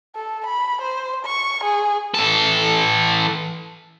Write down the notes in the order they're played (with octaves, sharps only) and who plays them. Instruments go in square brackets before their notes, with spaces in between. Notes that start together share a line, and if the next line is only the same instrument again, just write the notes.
[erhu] A4
B5
C5
C#6
G#4
[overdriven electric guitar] E3 A4